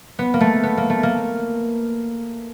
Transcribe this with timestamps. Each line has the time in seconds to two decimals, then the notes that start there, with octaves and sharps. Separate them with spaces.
0.19 B3
0.34 A#3
0.41 A3
0.63 B3
0.77 A#3
0.90 A3
1.03 A#3